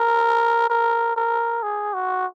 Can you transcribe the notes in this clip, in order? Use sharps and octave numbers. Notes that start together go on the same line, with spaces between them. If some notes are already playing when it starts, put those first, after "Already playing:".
Already playing: A#4
A#4
A#4
G#4
F#4